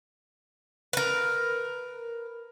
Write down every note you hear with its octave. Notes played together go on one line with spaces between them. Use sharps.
A#4 B4